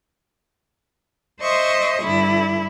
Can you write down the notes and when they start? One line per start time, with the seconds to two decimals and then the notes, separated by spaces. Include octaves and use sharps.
1.41 C5 D#5 E5 C6 C#6 D#6
2.02 G2 D3 E4